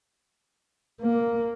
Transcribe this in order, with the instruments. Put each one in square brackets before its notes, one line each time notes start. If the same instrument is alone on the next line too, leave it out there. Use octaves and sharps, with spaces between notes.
[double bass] A#3